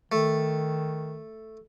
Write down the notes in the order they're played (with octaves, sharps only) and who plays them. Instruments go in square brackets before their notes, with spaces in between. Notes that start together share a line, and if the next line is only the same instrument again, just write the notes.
[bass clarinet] D#3 [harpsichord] A3